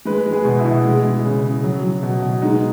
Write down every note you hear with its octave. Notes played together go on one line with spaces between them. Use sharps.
G#3 B4
G#3
G#4
B2
E4
B2
G#3
G#3
C#3
C#3
F#3
F#3
B2
B2
G#3 D#4